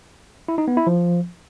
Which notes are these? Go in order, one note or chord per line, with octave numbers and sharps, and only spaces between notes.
E4
D#4
B3
E4
F3